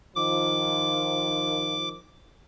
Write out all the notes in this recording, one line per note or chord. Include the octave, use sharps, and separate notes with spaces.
D#3 F3 D6